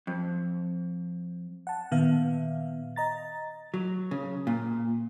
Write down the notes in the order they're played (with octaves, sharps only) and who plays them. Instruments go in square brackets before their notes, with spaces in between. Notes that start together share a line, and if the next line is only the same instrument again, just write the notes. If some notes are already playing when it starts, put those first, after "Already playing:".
[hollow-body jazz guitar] F2
[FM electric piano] F#5 A5
A#2 D#3 B3 E5 F5
D#5 A#5 A6
[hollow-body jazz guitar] F#3
C#3
A#2